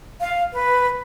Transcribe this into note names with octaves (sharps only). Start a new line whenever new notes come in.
F5
B4